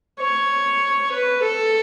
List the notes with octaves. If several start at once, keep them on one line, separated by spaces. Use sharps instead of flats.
C#5
B4
A4